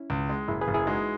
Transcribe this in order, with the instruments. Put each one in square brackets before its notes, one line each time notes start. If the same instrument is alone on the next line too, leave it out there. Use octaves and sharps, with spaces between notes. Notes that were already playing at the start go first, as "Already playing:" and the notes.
Already playing: [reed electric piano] C#4 E4
[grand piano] C#2
G#3
[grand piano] F#1 [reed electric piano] E4 G#4
[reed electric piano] G#4 B4
[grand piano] F#1
[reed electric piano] E4 G#4
[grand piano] G#3 [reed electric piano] D#4 F#4